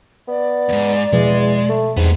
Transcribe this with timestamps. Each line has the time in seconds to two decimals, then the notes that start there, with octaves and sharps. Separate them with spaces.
0.28 B3 D5
0.69 D#2 G#2
1.12 E2 B2 F3 G#3
1.69 A3
1.97 E2 G#2 G3 B3